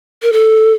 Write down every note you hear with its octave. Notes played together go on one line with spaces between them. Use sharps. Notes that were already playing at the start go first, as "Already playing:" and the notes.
A#4
A4